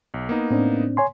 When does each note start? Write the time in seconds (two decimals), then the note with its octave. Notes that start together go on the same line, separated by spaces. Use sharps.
0.14 B1
0.29 A#3 B3 D#4
0.51 A2 C4 D4
0.97 C#5 G#5 C6